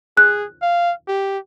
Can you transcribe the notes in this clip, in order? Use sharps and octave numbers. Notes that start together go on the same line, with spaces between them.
G#4 F#6
F5
G4